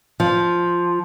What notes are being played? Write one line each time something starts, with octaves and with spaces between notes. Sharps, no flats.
F3